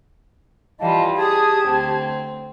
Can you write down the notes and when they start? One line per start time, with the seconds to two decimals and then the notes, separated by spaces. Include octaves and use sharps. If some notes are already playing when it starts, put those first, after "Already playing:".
0.80 E3 G3 F4 D#5 F5 A5
1.17 G4 G#4 A5 D#6 G#6
1.66 D2 C4